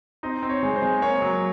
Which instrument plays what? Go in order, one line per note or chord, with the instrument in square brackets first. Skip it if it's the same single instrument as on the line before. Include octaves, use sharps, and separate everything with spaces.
[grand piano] C4 D#4 D#5
C4
C#5
G#3
C5
G#3
A#3 C#5
F#3